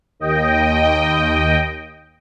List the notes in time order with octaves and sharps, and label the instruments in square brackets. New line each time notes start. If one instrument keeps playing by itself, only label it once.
[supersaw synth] D#2 D#5 G5